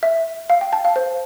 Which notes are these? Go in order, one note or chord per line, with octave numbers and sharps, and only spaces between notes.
E5
F5
G5
A5
F5
C5